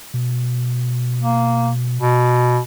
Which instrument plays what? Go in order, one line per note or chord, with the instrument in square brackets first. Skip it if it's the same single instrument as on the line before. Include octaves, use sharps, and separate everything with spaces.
[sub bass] B2
[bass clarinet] A#3
B2